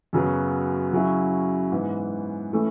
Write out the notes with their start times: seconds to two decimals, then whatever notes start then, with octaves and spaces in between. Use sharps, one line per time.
0.13 F#2 C#3 F#3 B3
0.93 C#3 F#3 C#4 E4
1.72 G#2 E3 B3
2.52 E3 A3 C#4 E4